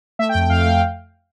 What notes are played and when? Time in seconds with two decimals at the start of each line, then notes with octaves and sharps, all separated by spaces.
0.19 A3 E5
0.29 G5
0.35 F2
0.40 G5
0.50 F2 F5
0.60 F5
0.65 A3 G5